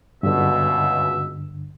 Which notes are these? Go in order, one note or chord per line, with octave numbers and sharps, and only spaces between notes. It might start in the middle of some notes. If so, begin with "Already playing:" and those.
C#2 G2 B2 D3 E5